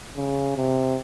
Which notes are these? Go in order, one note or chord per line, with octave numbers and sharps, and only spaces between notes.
C#3
C3